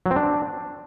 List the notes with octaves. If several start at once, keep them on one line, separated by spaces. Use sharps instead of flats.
F#3
C4
D4